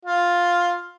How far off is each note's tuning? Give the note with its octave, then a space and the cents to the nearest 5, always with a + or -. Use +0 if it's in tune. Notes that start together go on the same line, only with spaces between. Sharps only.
F4 +5